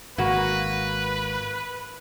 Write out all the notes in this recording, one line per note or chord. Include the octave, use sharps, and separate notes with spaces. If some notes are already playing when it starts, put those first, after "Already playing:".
G#1 A#3 F#4 B4